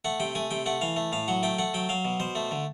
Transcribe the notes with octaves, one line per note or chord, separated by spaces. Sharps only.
A3 F#5
C3 G5
A3 G#5
C3 G5
A3 F#5
E3 F5
A3
A2 F5
F#3 F#5
A3 G5
A3 F#5
F#3 G5
F#3 F5
B2
B2 C5
A3
D3